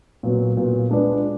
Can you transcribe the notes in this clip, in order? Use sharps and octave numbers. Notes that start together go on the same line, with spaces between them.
A#2 F#3 B3
A#2 F#3 B3
G#3 D4 F4 B4 D5